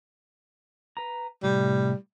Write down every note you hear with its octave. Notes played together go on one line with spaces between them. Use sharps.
B4 A#5
A2 C3 G3